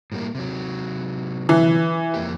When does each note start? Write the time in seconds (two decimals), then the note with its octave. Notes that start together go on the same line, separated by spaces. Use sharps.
0.12 A2 G3 A#3
0.35 C3 F#3
1.49 E3
2.14 F2 A#3 G4